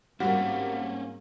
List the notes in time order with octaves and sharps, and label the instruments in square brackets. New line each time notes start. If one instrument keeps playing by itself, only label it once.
[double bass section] G#2 A#3 [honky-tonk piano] G3 [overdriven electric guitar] C4 C#4 [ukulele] F#4 F#5